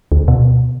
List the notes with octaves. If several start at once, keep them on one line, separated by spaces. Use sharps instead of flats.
D2
B2